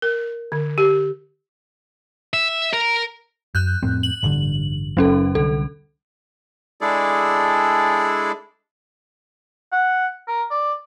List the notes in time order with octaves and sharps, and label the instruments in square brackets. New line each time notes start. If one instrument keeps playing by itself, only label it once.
[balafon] A#4
D3
G4
[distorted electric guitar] E5
A#4
[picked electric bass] F#2 [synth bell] F#6 G6
[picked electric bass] F2 A2 C4
[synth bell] F#7
[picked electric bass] A1 G2 D3
[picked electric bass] F#1 [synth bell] F#3 C#4 A4
[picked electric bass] C2 D3 [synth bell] A4
[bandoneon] G#3 D4 E4 G#4 A4 D5
[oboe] F#5
A#4
D5